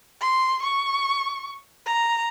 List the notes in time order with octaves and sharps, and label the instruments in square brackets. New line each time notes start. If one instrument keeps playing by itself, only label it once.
[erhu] C6
C#6
A#5